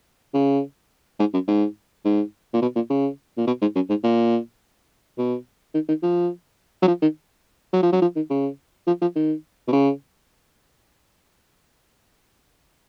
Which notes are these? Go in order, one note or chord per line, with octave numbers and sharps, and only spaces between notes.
C#3
G#2
F#2
G#2
G#2
A#2
B2
A#2
C#3
A#2
B2
G#2
F#2
G#2
A#2
B2
D#3
D#3
F3
F#3
F3
D#3
F#3
F3
F#3
F3
D#3
C#3
F3
F3
D#3
B2
C#3